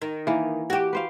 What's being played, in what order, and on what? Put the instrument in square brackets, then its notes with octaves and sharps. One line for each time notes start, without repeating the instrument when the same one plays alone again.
[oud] D#3
[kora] E3 A#3
[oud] F#4 G4
[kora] B4 C5 F5